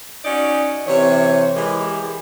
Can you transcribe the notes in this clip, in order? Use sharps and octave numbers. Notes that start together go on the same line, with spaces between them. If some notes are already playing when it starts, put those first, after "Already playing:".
C#4 D#4 F#4 D5
C3 E3 C#5
E3 G#3 G4 G#4 A#4